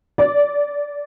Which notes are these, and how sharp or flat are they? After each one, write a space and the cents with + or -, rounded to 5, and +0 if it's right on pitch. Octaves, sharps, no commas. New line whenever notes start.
D5 -15